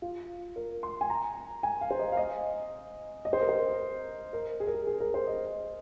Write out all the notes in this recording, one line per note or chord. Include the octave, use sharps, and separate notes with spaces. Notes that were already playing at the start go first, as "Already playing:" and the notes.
F4
A#4
C6
G#5
A#5
G#5
F5
C5
D#5
F5
D#5
D#5
C5
A#4
C5
A#4
G#4
A#4
G#4
G#4
A#4
C5
D#5